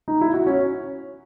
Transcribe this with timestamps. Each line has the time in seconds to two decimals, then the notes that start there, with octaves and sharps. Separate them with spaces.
0.08 D#4
0.21 E4
0.34 F#4
0.47 C#4